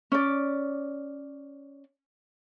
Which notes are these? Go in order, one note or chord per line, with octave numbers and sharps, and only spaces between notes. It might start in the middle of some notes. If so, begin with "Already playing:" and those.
C#4 D5